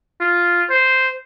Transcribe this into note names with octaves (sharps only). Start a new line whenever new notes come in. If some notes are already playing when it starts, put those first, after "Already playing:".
F4
C5